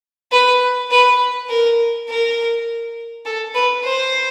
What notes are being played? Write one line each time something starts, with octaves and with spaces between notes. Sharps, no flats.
B4
B4
A#4
A#4
A4
B4
C5